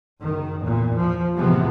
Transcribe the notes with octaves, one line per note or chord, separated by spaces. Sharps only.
F#1 D#3
E2 A#2
F3
A2 C3 E3 F3 G#3 B3